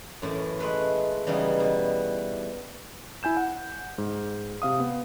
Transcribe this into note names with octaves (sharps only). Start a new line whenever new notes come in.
F#2 A2 E3
G#3 A3 B4 E5
C#3 E3 G3 B3 D#4
B2
E4 G#5 G6 E7
F#5
G#2
C3 F5 D#6
B3